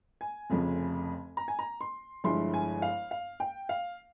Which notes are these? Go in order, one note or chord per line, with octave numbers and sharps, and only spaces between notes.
G#5
F1 F2 C#3 F3
A#5
G#5
A#5
C6
G1 G2 F3 G#3 E4 C6
G#5
F5
F5
G5
F5